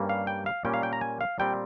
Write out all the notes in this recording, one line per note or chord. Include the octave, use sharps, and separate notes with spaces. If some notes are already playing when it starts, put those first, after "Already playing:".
Already playing: G2 G3 A#3 C#4
F5
G5
F5
A#2 G3 A#3 C#4 G5
F5
G5
A#5
G#5
F5
A#2 G3 C4 G5